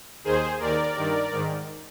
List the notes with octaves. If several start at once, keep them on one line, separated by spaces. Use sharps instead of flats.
D#2 D#3 G#4 C5
D#2 D#3 A#4 D5
G2 D#3
G#2 D#3